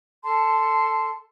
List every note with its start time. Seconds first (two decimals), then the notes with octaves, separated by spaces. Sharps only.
0.23 A4 A5 C6